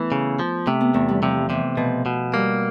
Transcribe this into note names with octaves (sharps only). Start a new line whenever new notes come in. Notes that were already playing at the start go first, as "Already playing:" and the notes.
Already playing: E3 A3 B3
C#3
F3
C3 A3
B3
E2 A3
G3
C3 F3
C3 E3
B2 F3
B2
G3 A#3